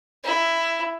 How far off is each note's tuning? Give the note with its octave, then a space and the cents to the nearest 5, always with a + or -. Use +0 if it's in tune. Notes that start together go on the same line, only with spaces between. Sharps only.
E4 +10